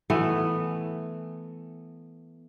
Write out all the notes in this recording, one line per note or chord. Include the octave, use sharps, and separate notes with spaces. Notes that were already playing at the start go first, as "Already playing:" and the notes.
E3 A3 B3